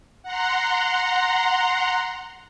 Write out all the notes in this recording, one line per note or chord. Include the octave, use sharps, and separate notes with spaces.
F#5 A#5 C6